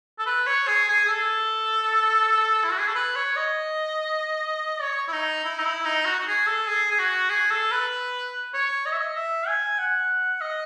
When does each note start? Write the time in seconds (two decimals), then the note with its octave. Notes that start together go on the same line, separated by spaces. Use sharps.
0.19 A4
0.26 B4
0.47 C#5
0.68 G#4
0.89 G#4
1.05 G#4
1.09 A4
2.64 E4
2.71 F#4
2.79 G#4
2.88 A4
2.95 B4
3.16 C#5
3.36 D#5
4.82 C#5
5.08 E4
5.12 D#4
5.44 E4
5.58 D#4
5.65 E4
5.85 D#4
6.05 F#4
6.19 F#4
6.27 G#4
6.47 A4
6.68 G#4
6.91 G#4
6.99 F#4
7.30 G#4
7.51 A4
7.71 B4
8.54 C#5
8.86 D#5
8.92 E5
8.99 D#5
9.16 E5
9.48 G#5
9.79 F#5
10.41 D#5